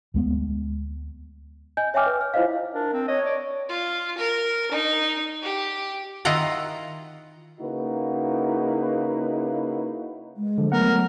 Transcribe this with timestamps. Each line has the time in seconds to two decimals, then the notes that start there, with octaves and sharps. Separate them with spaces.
0.14 D2 G#3 B3
1.77 D#5 G#5 G6
1.94 C#5 E5 G5 G#5 D6 F6
2.06 B4
2.21 F6
2.34 E4 F4 C5 D#5 F5
2.74 D4 A#4
2.93 C4
3.08 C#5 D#5
3.26 D5
3.69 F4
4.18 A#4
4.71 D#4
5.42 G4
6.25 D#3 E4 F4 D#5 F#5 A#5
7.59 C#3 A#3 D#4 E4 F#4 B4
10.37 G#3
10.58 D3 F3
10.72 F#3 A3 B3 A#4 F#5